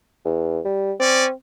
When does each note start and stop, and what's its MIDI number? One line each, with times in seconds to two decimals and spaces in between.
0.25 0.60 40
0.65 0.92 55
0.99 1.31 60
0.99 1.24 61
0.99 1.24 74